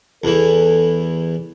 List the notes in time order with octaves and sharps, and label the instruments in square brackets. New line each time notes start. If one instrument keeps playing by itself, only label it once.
[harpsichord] E2 E3 [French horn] A4